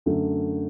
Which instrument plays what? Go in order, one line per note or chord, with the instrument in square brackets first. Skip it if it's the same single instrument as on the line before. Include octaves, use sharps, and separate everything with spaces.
[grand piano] F#2 D3 A3